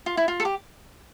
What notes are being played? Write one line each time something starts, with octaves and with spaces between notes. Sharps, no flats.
F4
E4
F4
A4
G4